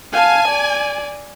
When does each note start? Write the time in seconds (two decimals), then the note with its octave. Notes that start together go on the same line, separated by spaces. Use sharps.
0.14 F5 G#5 A5
0.48 D5